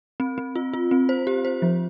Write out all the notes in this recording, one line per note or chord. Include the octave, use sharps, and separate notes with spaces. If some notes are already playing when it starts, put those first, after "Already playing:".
C4
C4
F4
F4
C4
C5
G4
C5
F3